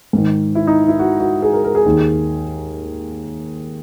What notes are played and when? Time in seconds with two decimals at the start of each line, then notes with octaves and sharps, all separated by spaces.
0.13 G#2 D#3
0.55 E4
0.67 D#4
0.88 E4
0.99 F#4
1.20 F#4
1.42 G#4
1.53 A#4
1.64 A#4
1.75 G#4
1.86 D#2 D#3